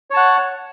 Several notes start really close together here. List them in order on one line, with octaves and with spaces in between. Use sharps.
C#5 A5 F#5